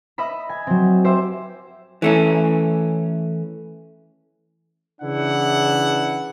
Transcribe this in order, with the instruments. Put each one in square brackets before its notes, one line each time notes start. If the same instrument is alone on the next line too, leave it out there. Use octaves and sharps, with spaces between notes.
[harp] D#5 E5 B5
G#5
F#3 C4
G4 C5 E5
[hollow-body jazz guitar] E3 A3 C#4
[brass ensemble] C#3 E3 D4 E4 F#5